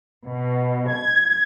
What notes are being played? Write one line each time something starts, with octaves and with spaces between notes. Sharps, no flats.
B2
G#6